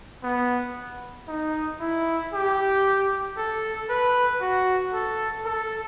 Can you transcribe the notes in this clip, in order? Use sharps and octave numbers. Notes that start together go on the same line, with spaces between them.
B3
D#4
E4
G4
A4
B4
F#4
A4
A4